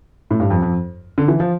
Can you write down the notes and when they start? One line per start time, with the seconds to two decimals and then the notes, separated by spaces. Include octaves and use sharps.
0.31 A2
0.40 G2
0.50 F2
0.62 F2
1.18 D3
1.28 E3
1.40 F3